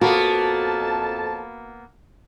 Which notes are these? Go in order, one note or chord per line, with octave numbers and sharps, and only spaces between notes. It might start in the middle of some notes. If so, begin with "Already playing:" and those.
F2 A#3 B3 F#4 A5